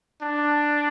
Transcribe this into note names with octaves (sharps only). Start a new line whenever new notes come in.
D4